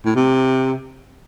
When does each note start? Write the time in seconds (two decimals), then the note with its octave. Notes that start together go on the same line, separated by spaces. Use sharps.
0.05 A2
0.15 C3